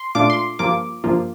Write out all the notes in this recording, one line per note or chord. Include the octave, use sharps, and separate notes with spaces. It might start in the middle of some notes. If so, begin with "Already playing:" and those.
Already playing: C6
A#2 A3 D4 F4 D6
C6
G2 F3 A#3 F4 D6
G2 F3 A#3 F4